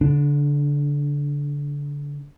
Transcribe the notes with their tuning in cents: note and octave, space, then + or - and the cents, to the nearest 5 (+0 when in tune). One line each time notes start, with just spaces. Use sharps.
D3 -30 D4 +0